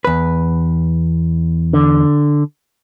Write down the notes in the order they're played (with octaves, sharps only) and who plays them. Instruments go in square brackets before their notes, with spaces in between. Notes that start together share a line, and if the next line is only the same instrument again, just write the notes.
[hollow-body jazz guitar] E2 B4
[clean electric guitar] D3